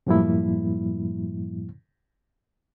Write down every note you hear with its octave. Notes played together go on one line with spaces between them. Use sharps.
F#2 A2 F3 G3 A#3 E4